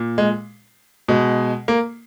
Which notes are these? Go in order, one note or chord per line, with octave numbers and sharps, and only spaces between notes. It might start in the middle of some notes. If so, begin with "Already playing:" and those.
Already playing: A#2
G#3
B2 G#3
A#3